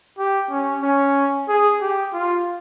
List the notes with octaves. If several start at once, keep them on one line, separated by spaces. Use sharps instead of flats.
G4
C#4
C#4
G#4
G4
F4